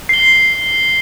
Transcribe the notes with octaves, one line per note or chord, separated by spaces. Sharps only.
C7 G7